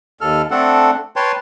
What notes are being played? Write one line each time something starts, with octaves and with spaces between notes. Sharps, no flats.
D#2 A4 F6
A3 C4 D4 A4 F#5
B4 C#5 G5 A5 C6